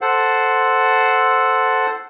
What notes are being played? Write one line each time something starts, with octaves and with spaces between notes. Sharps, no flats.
A4 C5 F#5